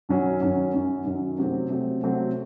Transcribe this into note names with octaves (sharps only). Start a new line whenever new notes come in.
F#2 D#3 F#3 C#4
F#2 D#3 F#3 C#4
F#2 D#3 F#3 C#4
F#2 D#3 F#3 C#4
C3 F#3 A3 C4
C3 F#3 A3 C4
C3 F#3 A3 C4